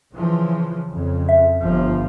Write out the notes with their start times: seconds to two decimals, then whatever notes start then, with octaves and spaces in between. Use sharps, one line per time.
0.14 C#3 E3 F3
0.87 F2 C#3
1.29 E5
1.62 G1 F3